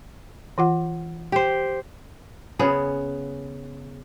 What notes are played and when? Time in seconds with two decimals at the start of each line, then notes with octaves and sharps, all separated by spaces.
0.58 E3 F4 F#5
1.32 G4 C5
2.59 C#3 B3 G#4